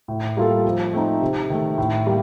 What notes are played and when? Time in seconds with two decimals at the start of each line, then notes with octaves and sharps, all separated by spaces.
0.08 A2
0.37 G3 A#3 F4 A4
0.65 F3
0.93 A3 C4 D#4
1.21 C3
1.50 D#3 A3
1.78 A2
2.07 G3 A#3